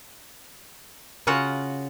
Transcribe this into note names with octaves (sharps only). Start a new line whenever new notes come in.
C#3 F4 F#4 F#5